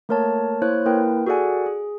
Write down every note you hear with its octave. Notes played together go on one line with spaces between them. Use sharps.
A3 A#3 A#4 C#5 A5
A#3 E4 C5 C#5 F#6
A#3 E4 A#4 B4 G5
F#4 G#4 A4 D5 F#5 G#5
G#4